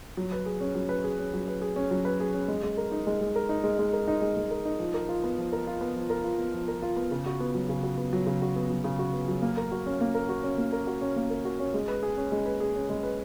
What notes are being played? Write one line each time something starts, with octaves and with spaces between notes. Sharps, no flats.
F#3
B4
G#4
C#4
F#3
B4
G#4
C#4
F#3
B4
G#4
C#4
F#3
B4
G#4
C#4
G#3
G#3
A#4
D#4
G#3
G#3
A#4
D#4
G#3
G#3
A#4
D#4
G#3
G#3
A#4
D#4
F3
A#4
F4
B3
F3
A#4
F4
B3
F3
A#4
F4
B3
F3
A#4
F4
B3
C#3
F#4
B3
F#3
C#3
F#4
B3
F#3
C#3
F#4
B3
F#3
C#3
F#4
B3
F#3
A#3
A#4
F#4
C#4
A#3
A#4
F#4
C#4
A#3
A#4
F#4
C#4
A#3
A#4
F#4
C#4
G#3
B4
G#4
C#4
G#3
B4
G#4
C#4
G#3
B4